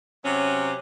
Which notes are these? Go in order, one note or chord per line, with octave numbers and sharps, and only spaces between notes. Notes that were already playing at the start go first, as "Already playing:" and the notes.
C3 F#3 C#4